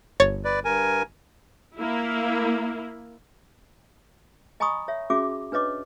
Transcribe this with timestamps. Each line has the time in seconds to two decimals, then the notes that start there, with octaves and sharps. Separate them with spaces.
0.20 G1 C#5 A6
0.45 B4 D5
0.65 G2 A#4 G#5
1.77 A#3 E4
4.60 D#5 G#5 A#5 B5 C#6 D#6
4.88 C#5 E5
5.10 C#4 F#4 G#4 E5 D6
5.52 D4 B4 C#5 D#5 D6